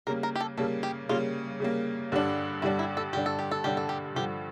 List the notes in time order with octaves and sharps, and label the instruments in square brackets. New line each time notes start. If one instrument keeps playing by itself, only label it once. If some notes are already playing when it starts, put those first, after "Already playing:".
[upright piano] C#3 G3 A#3 [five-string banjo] A#4
[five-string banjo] A#4
G4
A4
[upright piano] C#3 G3 A#3 [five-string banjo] A4
[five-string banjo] G4
[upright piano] C#3 G3 A#3 [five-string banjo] F4
[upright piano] C#3 G3 A#3
G2 D3 G3 D4
[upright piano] G2 D3 G3 D4 [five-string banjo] E4
[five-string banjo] E4
A4
[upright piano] G2 D3 G3 D4 [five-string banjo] G4
[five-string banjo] A4
G4
A4
[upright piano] G2 D3 G3 D4 [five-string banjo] G4
[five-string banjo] A4
G4
[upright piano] G2 D3 F3 [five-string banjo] G4